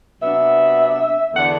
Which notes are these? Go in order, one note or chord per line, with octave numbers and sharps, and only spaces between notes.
C3 F#3 B3 D4 E5
E2 D3 A3 D4 F#5